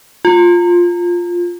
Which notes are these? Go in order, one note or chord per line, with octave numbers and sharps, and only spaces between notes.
F4